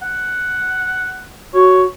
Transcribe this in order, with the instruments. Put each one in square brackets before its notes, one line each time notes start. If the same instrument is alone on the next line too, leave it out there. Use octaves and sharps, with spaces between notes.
[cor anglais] F#5
[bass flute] F#4 [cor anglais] C#5